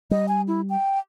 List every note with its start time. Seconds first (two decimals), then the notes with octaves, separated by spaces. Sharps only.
0.11 G3 D#5
0.28 G#5
0.47 E4
0.70 G5